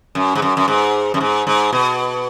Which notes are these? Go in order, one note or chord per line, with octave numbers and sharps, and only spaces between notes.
F#2
G#2
F#2
F#2
G#2
F#2
G#2
G#2
B2